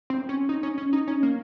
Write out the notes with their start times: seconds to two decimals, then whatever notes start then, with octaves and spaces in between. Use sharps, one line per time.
0.10 C4
0.29 C#4
0.49 D#4
0.63 C#4
0.78 C#4
0.93 D#4
1.08 C#4
1.23 A#3